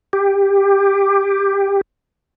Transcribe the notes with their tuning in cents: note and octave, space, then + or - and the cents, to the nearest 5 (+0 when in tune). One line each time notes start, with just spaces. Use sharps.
G4 +15